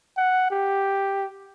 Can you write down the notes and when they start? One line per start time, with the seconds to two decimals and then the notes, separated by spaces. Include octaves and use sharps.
0.17 F#5
0.51 G4